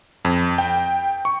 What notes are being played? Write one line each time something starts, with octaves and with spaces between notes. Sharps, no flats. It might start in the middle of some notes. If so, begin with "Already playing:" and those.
F2
G5
C#6